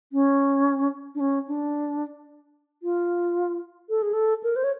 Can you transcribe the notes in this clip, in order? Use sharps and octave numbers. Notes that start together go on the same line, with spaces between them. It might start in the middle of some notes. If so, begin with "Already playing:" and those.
C#4
D4
C#4
D4
F4
A4
G#4
A4
A#4
C5
C#5